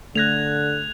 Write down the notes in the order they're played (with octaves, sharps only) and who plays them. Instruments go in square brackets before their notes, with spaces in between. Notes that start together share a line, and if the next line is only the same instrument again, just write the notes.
[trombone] D3 [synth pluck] A3 A#6 [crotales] F#6 G#6 F7